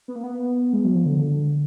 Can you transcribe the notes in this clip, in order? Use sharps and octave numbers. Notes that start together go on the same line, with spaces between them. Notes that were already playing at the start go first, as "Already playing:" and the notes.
B3
A#3
B3
G#3
F#3
F3
D3
D3